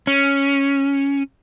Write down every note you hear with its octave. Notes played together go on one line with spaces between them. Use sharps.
C#4